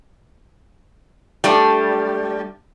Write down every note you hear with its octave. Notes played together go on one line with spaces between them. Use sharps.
G3 A3 D4